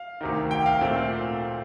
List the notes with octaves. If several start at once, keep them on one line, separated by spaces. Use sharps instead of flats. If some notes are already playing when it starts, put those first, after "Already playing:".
Already playing: F5
D2 C3 D#3
G5
F5
A#2 A3 C4